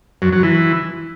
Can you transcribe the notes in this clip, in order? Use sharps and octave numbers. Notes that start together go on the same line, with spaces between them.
F#2
F#3
E3